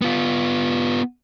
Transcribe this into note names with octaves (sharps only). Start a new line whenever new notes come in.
B3 F4